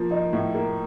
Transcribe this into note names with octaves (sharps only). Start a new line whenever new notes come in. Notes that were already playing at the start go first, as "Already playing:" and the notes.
Already playing: F3 A#3
D#4
A2
A#3